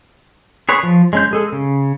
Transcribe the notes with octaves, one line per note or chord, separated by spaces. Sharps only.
G#4 B4 C#5
F3
G#3 C#4 G6
G#3 G#4 A4
C#3